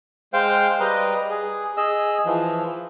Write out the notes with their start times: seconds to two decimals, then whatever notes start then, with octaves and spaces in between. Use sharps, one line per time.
0.33 G#3 C5 F5 G5
0.80 G3 B4 D#5 A#5
1.30 G#4
1.77 G#4 D#5 E6
2.26 E3 F3